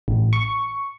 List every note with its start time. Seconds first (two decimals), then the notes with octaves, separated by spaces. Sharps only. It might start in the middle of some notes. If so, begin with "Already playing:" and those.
0.08 A1
0.33 C#6